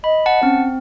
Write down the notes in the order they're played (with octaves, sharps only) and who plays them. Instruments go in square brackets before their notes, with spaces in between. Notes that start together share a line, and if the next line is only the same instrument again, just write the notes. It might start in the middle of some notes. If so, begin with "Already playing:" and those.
[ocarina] D#5 [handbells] B5
[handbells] F#5 A5
[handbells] C4 [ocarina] C#4